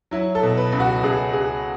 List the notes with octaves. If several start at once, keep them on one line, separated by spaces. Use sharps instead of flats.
F#3 E4
A4
B2
B4
C#2
F#4
C#2 G#4
C#2 G#4